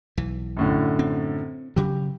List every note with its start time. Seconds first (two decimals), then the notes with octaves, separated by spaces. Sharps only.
0.17 B1 E3
0.57 F#2 A2 D3
0.99 C4
1.76 C#3 F#3 G4